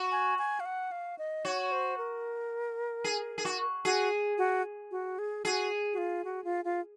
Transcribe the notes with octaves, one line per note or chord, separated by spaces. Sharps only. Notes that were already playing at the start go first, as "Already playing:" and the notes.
Already playing: F#4
G#5
G#5
F5
F#5
F5
D#5
F#4 C#5
C5
A#4
G#4
G#4
F#4
F#4 G#4
F#4
F#4
G#4
F#4 G#4
F#4
F4
F#4
F4
F4